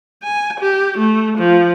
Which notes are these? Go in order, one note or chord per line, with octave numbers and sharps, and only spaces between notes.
G#5
G4
A3
F3